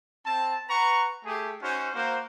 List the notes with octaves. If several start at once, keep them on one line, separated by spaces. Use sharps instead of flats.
C4 A5
B4 F#5 A#5 C#6
A3 G4 G#4
C#4 D#4 F#4 C5
A#3 F#4 C5